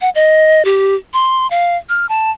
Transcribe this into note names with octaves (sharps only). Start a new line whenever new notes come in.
F#5
D#5
G4
C6
F5
F6
A5